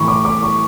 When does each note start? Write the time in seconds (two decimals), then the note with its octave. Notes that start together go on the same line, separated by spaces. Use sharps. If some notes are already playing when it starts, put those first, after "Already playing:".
Already playing: A2 E3 B5 C#6
0.08 D6
0.25 D6
0.43 C#6